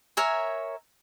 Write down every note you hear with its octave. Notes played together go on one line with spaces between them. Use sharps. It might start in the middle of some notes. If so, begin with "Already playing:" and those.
A#4 C#5 E5 G#5